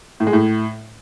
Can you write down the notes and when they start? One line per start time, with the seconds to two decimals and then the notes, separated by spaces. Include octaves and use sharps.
0.20 A2
0.27 G#3
0.33 A2